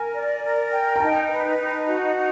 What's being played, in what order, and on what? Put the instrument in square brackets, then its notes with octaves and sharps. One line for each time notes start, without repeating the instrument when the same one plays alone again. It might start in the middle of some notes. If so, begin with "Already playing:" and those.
Already playing: [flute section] A#4 [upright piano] G#5
[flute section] D5
A#4
G5
[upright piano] A#5
[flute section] D#4 [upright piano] A5
[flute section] B4
D#4
F#4
D#4